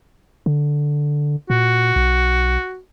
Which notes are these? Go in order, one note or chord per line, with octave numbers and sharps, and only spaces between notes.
D3
A#2 F#4
B1